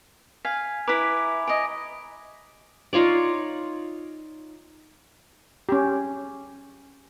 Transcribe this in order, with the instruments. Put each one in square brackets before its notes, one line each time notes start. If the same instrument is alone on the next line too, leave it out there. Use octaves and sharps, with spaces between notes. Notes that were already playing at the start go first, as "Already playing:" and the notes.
[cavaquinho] F5 [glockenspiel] G#5 G#6 B6
[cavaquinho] E4 B4 [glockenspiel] A#5 D6 D7
[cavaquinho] C#5 D#5 [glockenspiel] G#5 D7
[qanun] D#4 F4 C#5 D5
[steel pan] C#4 G4